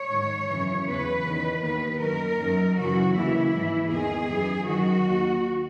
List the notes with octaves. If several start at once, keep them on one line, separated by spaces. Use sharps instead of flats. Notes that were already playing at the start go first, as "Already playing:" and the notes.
Already playing: C#5
G#2 D#3
F#2 C#3 E3
E2 C#3 E3 B4
E2 D#3
D#2 D#3 B4
F#2 D#3 A#4
F#2 D#3
F#2 C#3 E3 F#4
D#2 C#3 E3 E4
G#2 E3
E2 D#3 G#4
F#2 E3
F#2 D#3 F#4
D#2 D#3